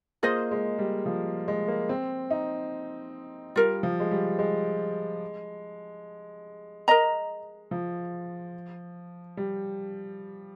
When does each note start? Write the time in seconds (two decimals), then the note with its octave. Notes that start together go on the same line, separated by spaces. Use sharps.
0.23 A#3 F4 G#4 C5 D#5
0.51 G#3
0.79 G3
1.06 F3
1.48 G#3
1.68 A#3
1.89 C4
2.31 D#4
3.56 G3 F4 A#4 F5
3.83 F3
4.00 G#3
4.11 G3
4.39 G#3
6.88 A#4 D#5 A#5
7.71 F3
9.37 G3